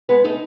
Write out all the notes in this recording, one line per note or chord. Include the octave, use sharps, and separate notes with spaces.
G#3 B3 B4
A3 D#4 A4